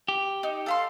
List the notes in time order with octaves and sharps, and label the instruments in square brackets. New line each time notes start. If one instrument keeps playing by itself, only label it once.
[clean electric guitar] G4
[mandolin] D#4
[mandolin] A4 B5 C6 [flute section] F5